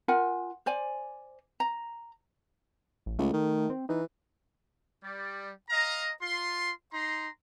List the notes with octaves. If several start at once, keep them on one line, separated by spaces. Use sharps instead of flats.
F4 A#4 F#5 G#5
C5 D5 G#5
A#5
A1
C#2 A3
D#3
C4
E3 D#4
G3 D5
D#5 F5 A#5
F4 C6
D#4 A#5 C6